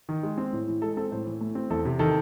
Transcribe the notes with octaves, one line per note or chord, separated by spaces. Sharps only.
D#3
G#3
C4
A2
E3
G#3 A4
C4 A4
A2 C5
E3
A3
C4
E2 A4
C3
D#3 A4